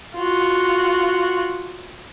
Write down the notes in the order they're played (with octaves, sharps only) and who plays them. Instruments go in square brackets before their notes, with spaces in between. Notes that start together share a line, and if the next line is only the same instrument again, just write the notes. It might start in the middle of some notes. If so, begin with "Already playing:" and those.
[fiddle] F4 F#4